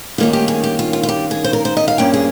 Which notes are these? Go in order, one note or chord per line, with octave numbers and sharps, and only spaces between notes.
G2 D#3 A#3 C#4 F4
G4
G#4
G4
F4
F4
F4
G4
G#4
C5
A#4
C5
D#5
F5
G2 F3 A#3 C#4 G5
G#4